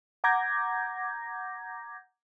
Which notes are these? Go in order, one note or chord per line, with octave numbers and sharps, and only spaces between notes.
F#5 A#5 D6 G6 G#6 A#6